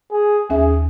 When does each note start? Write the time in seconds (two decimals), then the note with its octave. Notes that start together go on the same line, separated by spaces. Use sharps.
0.11 G#4
0.50 D#2 C#4 G#4 E5